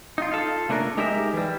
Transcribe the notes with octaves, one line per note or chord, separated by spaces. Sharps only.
D#4 F4
F4 A4
C#3 A3 A#3 D4 A#4
G#3 D#4 G4 A#4 E5
E3 G3